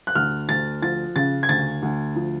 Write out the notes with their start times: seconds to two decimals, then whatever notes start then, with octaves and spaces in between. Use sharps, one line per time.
0.07 F#6
0.15 D2 F6
0.49 D2 A6
0.82 F3 A6
1.16 C#3 A6
1.43 G#6
1.49 D2 A6
1.82 D2
2.16 F3